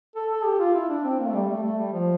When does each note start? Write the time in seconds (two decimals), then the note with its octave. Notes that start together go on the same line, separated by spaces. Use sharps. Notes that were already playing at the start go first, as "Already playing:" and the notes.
0.16 A4
0.31 A4
0.45 G4
0.59 F4
0.75 E4
0.89 D4
1.04 C4
1.19 A#3
1.27 A3
1.34 G3
1.49 A3
1.63 A3
1.78 G3
1.92 F3